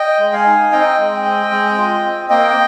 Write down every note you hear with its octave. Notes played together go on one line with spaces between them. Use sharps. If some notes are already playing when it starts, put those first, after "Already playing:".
Already playing: D#5 G5
G#3
F5 G#5
D#4
C4 D#5 G5
G#3
C4
G#3
F4
C4
A#3 D#5 G5